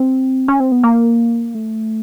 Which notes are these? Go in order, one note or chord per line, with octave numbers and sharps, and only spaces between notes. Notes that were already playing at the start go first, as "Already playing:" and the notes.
Already playing: C4
C#4
C4
B3
A#3
A3